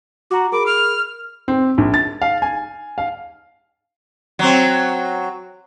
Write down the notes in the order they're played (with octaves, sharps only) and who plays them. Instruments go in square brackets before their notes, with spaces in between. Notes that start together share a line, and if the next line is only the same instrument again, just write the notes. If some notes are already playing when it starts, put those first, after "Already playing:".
[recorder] F#4 [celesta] A#5 D6
[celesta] G#4 A#4 B5 [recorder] D6
[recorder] F6
[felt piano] C4
A#1
A6
F5
G#5
F5
[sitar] F#3 C4